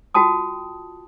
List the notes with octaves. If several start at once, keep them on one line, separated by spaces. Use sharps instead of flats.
F4 F#4 G5 A5 D#6